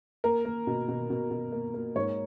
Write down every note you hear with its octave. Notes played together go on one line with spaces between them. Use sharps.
A#3 A#4
A#3
B2
B2
B2
B2
A#3
A#3
G#2 C#5